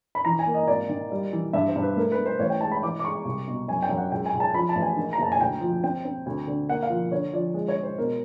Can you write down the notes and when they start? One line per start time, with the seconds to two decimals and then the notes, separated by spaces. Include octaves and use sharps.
0.15 B5
0.25 E3 A#5
0.39 G#5
0.46 A#3
0.54 D#5
0.68 G#1 D5
0.89 D#3
1.12 G3
1.33 E3
1.53 G2 E5
1.68 C5
1.76 G2
1.83 B4
1.97 A3 A#4
2.12 B4
2.18 A3
2.26 C5
2.39 A1 C#5
2.50 G5
2.61 G#2 A5
2.72 B5
2.83 E3 D6
2.99 D6
3.04 G#3 C#6
3.25 C2
3.47 B2
3.68 F#2 G#5
3.82 G5
3.89 F#2
3.98 F#5
4.11 C#2 G5
4.26 G#5
4.33 C#2
4.40 A5
4.54 F3 B5
4.69 A5
4.75 A1
4.82 G#5
4.97 D#3
5.13 A#5
5.18 F#1 A5
5.32 G#5
5.40 D2 G5
5.61 F3
5.83 C4 G5
6.05 C4
6.26 D2
6.47 D3
6.69 A#3 F#5
6.83 F5
6.90 F3
7.11 D3 C#5
7.33 F3 D5
7.54 G#3
7.68 C#5
7.76 G#3
7.83 C5
7.98 B2 A#4